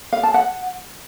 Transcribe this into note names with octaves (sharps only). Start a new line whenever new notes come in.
F5
A5
F#5